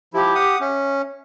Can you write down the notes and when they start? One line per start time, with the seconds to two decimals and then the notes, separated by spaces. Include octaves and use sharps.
0.14 F3 E4 G4 D6
0.35 F#5 D#6
0.61 C#4 E5